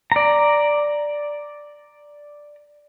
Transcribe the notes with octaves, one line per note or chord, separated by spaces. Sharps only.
D5 A#5